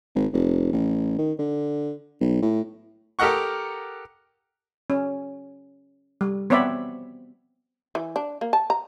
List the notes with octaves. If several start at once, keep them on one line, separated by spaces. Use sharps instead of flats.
G#1
F1
A1
D#3
D3
B1
A2
G4 A4 A#4 D#5 F#5 C#6
C#4
G3
B3 C4 C#5 D5 E5 B5
E3
D4
A#3
A5
A#5